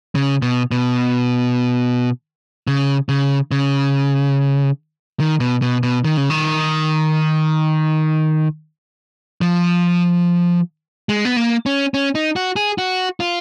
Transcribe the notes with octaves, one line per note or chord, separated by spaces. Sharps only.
C#3
B2
B2
C#3
C#3
C#3
D#3
B2
B2
B2
D#3
C#3
D#3
F3
G#3
B3
A#3
C#4
C#4
D#4
F#4
G#4
F#4
F4